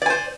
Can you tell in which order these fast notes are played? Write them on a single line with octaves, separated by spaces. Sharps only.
D5 G#5 C5